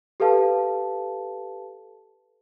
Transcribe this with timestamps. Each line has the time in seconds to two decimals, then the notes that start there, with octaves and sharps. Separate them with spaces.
0.20 G4 A4 B4 F5 A5